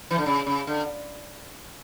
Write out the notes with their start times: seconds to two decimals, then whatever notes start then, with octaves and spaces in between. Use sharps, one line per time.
0.11 E3
0.18 D3
0.26 C#3
0.46 C#3
0.67 D3